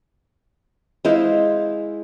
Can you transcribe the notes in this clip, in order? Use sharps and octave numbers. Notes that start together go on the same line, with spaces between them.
G#3 E4 C5 F5